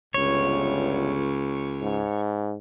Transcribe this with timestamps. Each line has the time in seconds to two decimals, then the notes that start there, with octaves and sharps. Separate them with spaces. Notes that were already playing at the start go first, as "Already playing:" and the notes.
0.14 G1 C#2 C#5
1.82 G#2